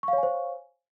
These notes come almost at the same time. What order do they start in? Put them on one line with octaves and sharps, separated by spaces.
C#6 F5 C#5 G#5 C5